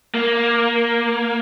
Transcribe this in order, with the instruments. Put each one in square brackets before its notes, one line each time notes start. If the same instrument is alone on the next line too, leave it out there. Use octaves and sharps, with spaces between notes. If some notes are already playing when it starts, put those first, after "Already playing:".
[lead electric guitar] A#3